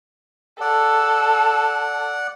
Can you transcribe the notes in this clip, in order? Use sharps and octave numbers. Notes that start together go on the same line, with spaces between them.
A4 D5 F#5